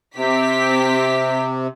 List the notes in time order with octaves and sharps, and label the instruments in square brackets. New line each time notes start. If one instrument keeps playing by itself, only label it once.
[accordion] C3 [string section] C4 G4 B6